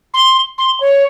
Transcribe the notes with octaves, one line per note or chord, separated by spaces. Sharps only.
C6
C6
C#5